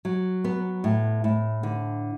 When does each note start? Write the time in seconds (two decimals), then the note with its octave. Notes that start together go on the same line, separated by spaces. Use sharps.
0.05 F#3
0.44 B3
0.84 A2
1.24 A2
1.63 D3